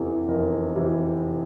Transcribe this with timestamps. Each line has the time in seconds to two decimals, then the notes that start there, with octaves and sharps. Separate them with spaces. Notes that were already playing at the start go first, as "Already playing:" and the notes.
Already playing: F1 E2 C3 E3 A4
0.28 F1 A#4
0.76 C3 E3